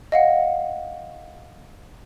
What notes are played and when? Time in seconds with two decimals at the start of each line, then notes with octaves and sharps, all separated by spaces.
0.12 D#5 F5 F#5